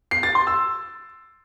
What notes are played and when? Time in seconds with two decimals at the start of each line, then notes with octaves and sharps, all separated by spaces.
0.11 C7
0.23 A6
0.35 C6
0.47 E6